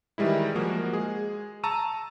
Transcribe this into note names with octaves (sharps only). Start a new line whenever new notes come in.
D#3 E3 G3 G#3 E4
F3 G#3 A#3 F#4 G#4 A#4
G#3 G#4
A5 A#5 C#6 E6 D#7